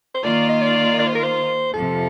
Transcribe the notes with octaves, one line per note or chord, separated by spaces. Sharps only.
C5
D#3 A#3 F4 D5
D#5
D5
D5
C5
A#4
C5
F2 C3 F3 A4